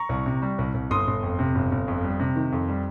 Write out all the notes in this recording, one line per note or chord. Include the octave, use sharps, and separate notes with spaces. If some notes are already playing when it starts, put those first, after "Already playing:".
Already playing: A#5 C#6
C2
C3
G3
C2
C2
G1 C6 D#6
G1
F2
C3
G1
G1
F2
G3
C3
D#3
F2
G3